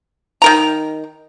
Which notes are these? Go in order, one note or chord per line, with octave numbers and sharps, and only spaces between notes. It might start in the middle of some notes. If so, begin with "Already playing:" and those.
D#3 A#4 A#5